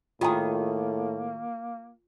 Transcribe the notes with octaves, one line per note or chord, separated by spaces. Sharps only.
A2 D#3 A#3 F4 G#4 G5 A#5